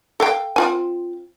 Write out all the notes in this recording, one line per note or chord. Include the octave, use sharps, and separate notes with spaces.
A4 F5 G5
C4 F4 G#5